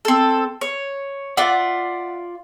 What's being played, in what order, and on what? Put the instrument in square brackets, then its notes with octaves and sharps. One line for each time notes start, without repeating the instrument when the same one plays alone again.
[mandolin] C4 A4
C#5
[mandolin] F4 D5 [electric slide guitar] E5 F#5